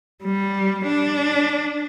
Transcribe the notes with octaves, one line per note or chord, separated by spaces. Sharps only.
G3
D4